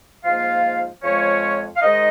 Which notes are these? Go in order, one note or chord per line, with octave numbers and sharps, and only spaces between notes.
G#2 F3 A#3 F4 F5
F2 F3 G#3 C#4 C#5
F5
G#2 D#3 G#3 D#4 D#5